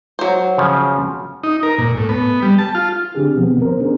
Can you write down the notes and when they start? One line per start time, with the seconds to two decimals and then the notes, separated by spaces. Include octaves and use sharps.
0.19 F#3 C5
0.58 C#3 F3 C#4
1.44 D#4
1.63 A#4
1.78 A#2
1.97 A2
2.09 B3
2.42 G3
2.58 A5
2.75 F4
3.15 D3 C4 D4 G4 G#4
3.36 B2 D#3 F3 B3 C4
3.62 A#4 C5
3.79 B3 C#4 D4 G#4